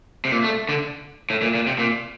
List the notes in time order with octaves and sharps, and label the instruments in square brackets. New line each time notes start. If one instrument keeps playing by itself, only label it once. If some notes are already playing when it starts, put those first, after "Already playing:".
[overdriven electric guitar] C3
A#2
A3
D3
A2
A#2
A#2
C3
A#2